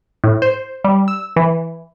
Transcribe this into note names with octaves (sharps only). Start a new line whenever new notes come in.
A2
C5
G3
E6
E3